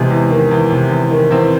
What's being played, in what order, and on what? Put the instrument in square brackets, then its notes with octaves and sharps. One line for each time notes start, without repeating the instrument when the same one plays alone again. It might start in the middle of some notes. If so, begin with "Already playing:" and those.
Already playing: [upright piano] E2 C3 G#3 G#4
E2
D#3
E2
C3
E2
D#3
E2 C4